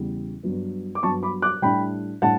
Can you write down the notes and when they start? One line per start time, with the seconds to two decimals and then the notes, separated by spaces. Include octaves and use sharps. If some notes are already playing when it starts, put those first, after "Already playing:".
Already playing: E2 C#3 G3
0.43 G2 F#3 B3
0.95 D6
1.03 G2 F#3 B3 A5 C#6
1.23 B5 D6
1.42 D6 F#6
1.62 A2 G3 D4 G5 B5
2.22 A2 G3 D4 F#5 A5